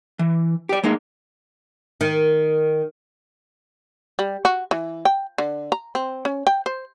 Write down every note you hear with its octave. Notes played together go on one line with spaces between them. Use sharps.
E3
G4 D5
G#3 A#3 D#4
D#3
G3
F#4
E3
G5
D3
A#5
C4
C#4
G5
C5